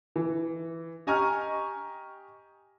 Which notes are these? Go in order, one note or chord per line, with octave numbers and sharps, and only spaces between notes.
E3
G4 D#5 G#5 A#5 C#6 F6